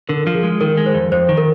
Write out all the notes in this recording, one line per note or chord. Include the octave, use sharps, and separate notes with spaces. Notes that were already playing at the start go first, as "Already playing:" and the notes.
D3 A#4
F3 A#4
G#4
G#3
D#3 A#4
G#3
C5
F2
F2 C5
D#3
A#4